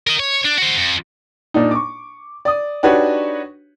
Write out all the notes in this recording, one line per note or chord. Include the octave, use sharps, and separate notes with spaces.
A#4 D#5
C#5
D4
F#4 C5
F2
A#2 D4 D#4
C#6 D6
D5 D#6
D4 D#4 F#4 G4 B4 C#5